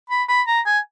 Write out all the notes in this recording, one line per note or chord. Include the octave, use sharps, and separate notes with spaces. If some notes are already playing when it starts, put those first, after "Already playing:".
B5
B5
A#5
G#5